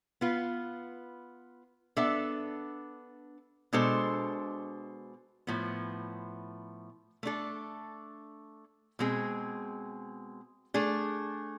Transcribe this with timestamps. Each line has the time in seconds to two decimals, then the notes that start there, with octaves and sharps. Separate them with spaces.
0.21 B3 F4 B4
1.97 B3 D4 A4 E5
3.73 B2 G#3 D4 A4 C5
5.47 A2 F3 B3
7.23 A3 D4 A4
8.99 B2 G#3 C4 G#4
10.74 A3 D4 G#4